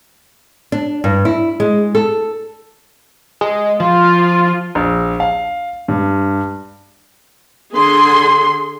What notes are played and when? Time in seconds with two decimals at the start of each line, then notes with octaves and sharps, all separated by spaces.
0.72 D4
1.04 G2
1.25 E4
1.60 G#3
1.95 A4
3.41 G#3
3.80 F3 F4
4.75 A#1
5.20 F5
5.88 G2
7.74 D3 G#4 C6